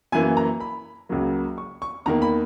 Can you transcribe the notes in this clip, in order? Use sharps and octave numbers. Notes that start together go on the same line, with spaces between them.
F#2 E3 A#3 G#5
A#5
B5
C#2 C#3 F#3 A#3
C#6
C#6
E2 D#3 A#3 A#5
B5